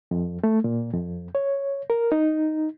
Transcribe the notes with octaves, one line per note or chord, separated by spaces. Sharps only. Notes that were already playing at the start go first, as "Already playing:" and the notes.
F2
A3
A#2
F2
C#5
A#4
D#4